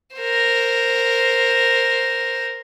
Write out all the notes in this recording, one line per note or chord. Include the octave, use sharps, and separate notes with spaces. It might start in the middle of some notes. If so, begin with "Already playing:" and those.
A#4 C5